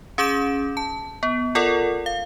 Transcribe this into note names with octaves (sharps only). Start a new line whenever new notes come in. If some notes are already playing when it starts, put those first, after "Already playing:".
C#4 G#4 D6 G6 D7 E7
A5
B3
F4 A4 A#4 D5 F#5
F5